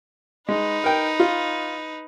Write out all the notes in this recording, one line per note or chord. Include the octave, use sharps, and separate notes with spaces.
G#3 D#4 B4
A#4 G5
F4